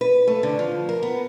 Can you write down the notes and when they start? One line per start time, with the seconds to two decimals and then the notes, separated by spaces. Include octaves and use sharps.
0.01 B4
0.27 A3
0.43 D3
0.59 F3
0.89 A#4
1.03 B3